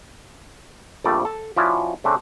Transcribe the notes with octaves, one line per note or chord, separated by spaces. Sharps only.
A#1 F2 G3 A3 D5
A4 A5
F3 C#4 E4 F#4 D5 E5
C#3 A3 C4 D4